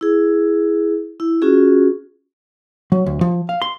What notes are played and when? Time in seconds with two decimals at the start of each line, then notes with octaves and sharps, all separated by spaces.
0.01 E4 G#4
1.20 E4
1.42 C#4 F4 F#4 G#4
2.92 F#3
3.06 D2
3.21 F3
3.49 F5
3.62 C6